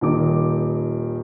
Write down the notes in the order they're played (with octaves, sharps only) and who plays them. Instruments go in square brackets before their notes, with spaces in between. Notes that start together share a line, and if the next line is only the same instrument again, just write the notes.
[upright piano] D#1 D#3 D6